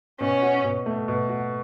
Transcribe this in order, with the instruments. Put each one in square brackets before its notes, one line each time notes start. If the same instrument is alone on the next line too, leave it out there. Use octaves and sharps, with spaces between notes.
[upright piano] B2 [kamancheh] C#4
[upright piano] F#4
B2
A3
B2
F#4